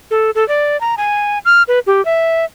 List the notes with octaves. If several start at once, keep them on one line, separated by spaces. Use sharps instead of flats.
A4
A4
D5
A#5
G#5
F6
B4
G4
E5